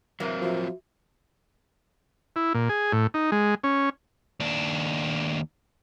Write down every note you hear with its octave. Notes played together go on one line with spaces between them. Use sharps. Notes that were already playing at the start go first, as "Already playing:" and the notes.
C3 E3 F#3 A#3 C4
F3 F#4 E5
E4
A#2
G#4
A2
D#4
G#3
C#4
D#2 D4